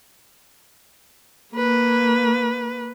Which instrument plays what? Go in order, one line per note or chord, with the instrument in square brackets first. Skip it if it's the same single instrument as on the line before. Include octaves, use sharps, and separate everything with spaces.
[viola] A#3 B4